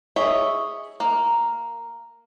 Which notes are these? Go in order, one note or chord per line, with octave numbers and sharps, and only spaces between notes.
G#4 C#5 D#5 E5
A#3